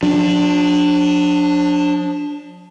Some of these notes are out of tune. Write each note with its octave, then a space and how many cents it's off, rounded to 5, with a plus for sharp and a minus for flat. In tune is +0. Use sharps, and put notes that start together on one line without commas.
F3 +40 D4 +0